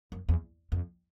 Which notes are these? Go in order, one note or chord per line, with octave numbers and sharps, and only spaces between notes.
F#2
E2
F2